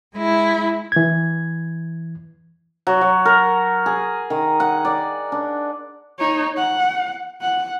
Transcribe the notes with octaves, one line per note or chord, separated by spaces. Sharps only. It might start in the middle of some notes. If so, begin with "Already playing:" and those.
G#3 E4
E3 G#6
F#3
F#3
A#4
G#4
D#3
F#5
D5
D4
D#4 C#5
F#5
F#5